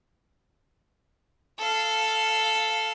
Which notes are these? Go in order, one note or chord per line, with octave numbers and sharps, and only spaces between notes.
A4 F5